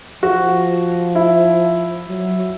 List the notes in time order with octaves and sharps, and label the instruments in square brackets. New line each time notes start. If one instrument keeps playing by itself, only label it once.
[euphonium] F3 [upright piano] F#4
[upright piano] E4
[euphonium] F#3